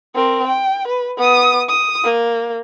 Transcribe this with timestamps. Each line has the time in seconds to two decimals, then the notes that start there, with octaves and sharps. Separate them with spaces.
0.15 C4 A#4
0.47 G5
0.88 B4
1.18 B3 D#6
1.69 D#6
2.04 A#3